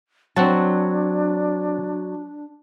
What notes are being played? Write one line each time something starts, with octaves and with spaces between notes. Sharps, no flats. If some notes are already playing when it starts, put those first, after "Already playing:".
F#3 C4 D4 F#5 A5